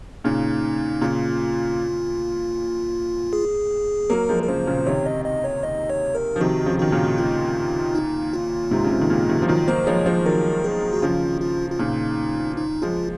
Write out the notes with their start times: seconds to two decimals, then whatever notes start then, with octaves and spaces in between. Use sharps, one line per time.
0.24 A#2 C#3 D#4
1.01 A#2 C#3 F4
3.33 G#4
4.10 F#3 A#3 A#4
4.29 F3 G#3
4.43 A#4
4.48 C#3 F3 C5
4.67 A#2 C#3
4.86 C3 D#3 C#5
5.06 D#5
5.25 D#5
5.44 C#5
5.63 D#5
5.90 C#5
6.15 A#4
6.36 F3
6.40 C3 D#3 F#4
6.66 C#3 F3
6.79 D#3 F#4
6.92 A#2 C#3
7.18 F4
7.95 D#4
8.33 F4
8.71 G#2 C3
8.84 C#3
8.90 G#2 C3
9.01 D#3
9.10 A#2 C#3
9.29 C3 D#3
9.42 F3
9.48 D#3 F#3 F4
9.67 F#3 A#3 C5
9.87 F3 G#3 C#5
10.06 F3 G#3 C5
10.26 D#3 F#3 A#4
10.64 G#4
10.93 F#4
11.02 C#3 F3 F4
11.41 F4
11.71 F4
11.79 A#2 C#3 D#4
12.57 D#4
12.82 F3 G#3 F4